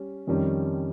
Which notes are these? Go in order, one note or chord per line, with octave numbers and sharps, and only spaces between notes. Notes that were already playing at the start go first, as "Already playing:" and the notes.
Already playing: G3 C#4
F2 D#3 G3 C#4